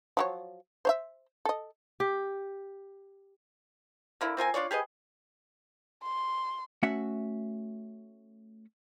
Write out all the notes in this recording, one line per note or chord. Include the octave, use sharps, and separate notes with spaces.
F3 F#3 C#5
C5 C#5 E5
A4 D#5
G4
D3 A#3 E4
C4 F4 A#4 G#5
D4 F4 C#5 D5
G4 G#4 B4 D#5
C6
A3 C#4 F#4 E5 F#5